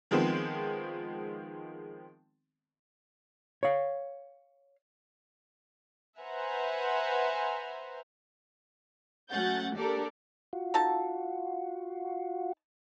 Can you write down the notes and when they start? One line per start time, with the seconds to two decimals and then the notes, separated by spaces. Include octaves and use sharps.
0.11 D#3 F3 G#3 B3 C4
3.63 C#5 F5
6.20 B4 C5 E5 F#5 G#5 A#5
9.31 F#3 A3 C#4 F#5 G6 A6
9.76 A#3 D4 G4 A4 A#4 D5
10.53 F4 F#4
10.74 D#4 A4 A5